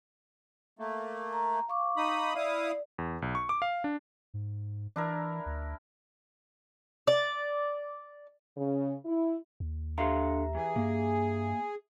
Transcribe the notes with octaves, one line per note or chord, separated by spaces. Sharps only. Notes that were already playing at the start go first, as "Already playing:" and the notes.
A3 A#3
A#5
F5 C#6 D6
D#4 B5 D#6
E4 D5 F5 D#6
E2
B1
C#6
D6
F5
D4
G#2
E3 D4 E4 A#4
D2
D5
C#3
E4
D#2
D3 G4 E5 F5 A#5 C6
E3 G#4
G2 A#3